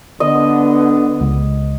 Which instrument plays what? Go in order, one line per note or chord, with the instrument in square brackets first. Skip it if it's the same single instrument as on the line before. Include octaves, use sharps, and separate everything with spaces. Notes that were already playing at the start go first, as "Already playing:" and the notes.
[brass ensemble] D3 [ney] B3 [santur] D#5
[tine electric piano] C#2